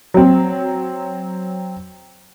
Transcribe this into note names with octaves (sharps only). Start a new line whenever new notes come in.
F#3 C4